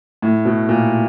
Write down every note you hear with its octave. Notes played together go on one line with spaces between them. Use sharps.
A2
B2
A#2